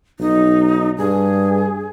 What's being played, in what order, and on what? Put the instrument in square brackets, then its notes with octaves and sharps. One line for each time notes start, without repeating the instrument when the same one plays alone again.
[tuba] B1 [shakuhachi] D#4
[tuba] G2 [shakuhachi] G#4